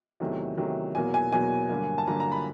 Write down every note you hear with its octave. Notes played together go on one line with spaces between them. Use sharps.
E2 C3 D#3 F#3 A3
E2 C3 D#3 F#3 A3
E2 B2 F#3 A#3 G#5
G#5
E2 B2 F#3 A#3 G#5
G2 D3 F#3 A#3
A5
G2 D3 F#3 A#3 A#5
A#5
B5